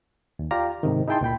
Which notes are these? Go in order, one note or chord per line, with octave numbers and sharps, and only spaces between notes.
D#2
F4 G4 D5 F5 A#5
G#2 C3 D#3
D#4 E4 G#4 G5 A5 C6
C#2 A#2 G5 B5